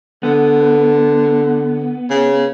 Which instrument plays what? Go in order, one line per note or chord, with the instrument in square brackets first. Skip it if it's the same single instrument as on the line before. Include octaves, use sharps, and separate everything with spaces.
[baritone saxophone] D3 [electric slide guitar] B3
[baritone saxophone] C#3